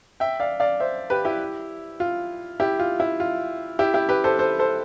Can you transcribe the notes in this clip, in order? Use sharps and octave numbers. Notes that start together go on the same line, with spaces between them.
E5 G5
D5 F5
D5 F5
C5 E5
G4 B4
E4 G4
F4
E4 G4
F4
E4
F4
E4 G4
E4 G4
G4 B4
A4 C5
A4 C5
A4 C5